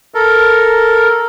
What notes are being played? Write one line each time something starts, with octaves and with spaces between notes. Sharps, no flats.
A4 A#4